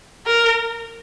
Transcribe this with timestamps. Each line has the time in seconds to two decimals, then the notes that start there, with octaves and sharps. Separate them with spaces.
0.26 A#4